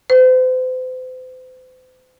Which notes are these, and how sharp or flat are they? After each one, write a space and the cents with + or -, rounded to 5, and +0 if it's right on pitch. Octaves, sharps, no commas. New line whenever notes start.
C5 -40